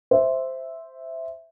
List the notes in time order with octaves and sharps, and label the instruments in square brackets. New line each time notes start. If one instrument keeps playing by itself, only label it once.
[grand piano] C5 E5